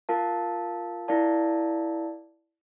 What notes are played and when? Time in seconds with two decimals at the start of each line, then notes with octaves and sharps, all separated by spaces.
0.09 F4 A#4 F5 A5
1.08 E4 A#4 D5 F5 A5